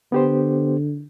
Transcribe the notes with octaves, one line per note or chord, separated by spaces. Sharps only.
D3 B3 G4 C5